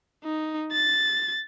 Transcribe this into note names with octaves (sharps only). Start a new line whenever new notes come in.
D#4
A6